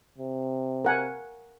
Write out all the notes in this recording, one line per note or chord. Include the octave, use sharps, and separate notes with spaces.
C3
A#4 F#5 G#5